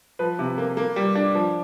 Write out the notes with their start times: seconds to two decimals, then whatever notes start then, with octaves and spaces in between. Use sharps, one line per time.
0.19 F3 B4
0.39 C3
0.58 A#3
0.77 A#3
0.96 G3
1.15 D4
1.35 F3